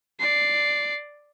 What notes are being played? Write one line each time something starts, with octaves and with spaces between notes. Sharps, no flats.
D5 C7